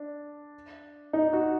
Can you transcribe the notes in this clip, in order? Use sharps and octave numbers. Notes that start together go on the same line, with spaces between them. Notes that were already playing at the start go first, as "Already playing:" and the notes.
Already playing: D4
D#4
F#4